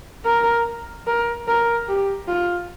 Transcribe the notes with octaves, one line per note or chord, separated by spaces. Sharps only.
A#4
A#4
A#4
G4
F4